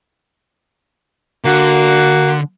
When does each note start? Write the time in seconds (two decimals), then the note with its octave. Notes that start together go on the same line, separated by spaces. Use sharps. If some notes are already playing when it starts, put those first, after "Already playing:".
1.45 D3 A#3 F#4